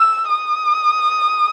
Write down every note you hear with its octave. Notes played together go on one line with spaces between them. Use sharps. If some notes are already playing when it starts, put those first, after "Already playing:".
Already playing: E6
D#6